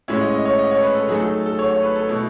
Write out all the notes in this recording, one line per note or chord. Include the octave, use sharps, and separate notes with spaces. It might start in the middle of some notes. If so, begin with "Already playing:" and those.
A2 G#3 C#4 E4 E5
D#5
D#5
C#5
D#5
C#5
B4
A4
F#3 A3 D#4 G#4
A4
A4
C#5
C#5
B4
A4
B2 A3 E4